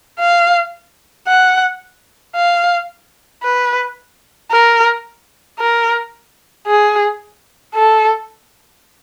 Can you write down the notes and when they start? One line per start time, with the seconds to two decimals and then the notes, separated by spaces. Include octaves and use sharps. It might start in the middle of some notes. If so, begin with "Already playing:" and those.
0.19 F5
1.28 F#5
2.36 F5
3.43 B4
4.51 A#4
5.59 A#4
6.67 G#4
7.75 A4